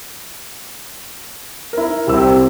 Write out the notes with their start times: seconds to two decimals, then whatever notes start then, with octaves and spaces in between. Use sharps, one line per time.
1.73 E4 A#4
2.07 C2 C3 C4 E4 G4 E6